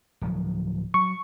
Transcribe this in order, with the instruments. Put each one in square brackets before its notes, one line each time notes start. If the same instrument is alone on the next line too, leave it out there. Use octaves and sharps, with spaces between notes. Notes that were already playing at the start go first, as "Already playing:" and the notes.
[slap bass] D1 F3 F#3
[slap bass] F#3 [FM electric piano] C#6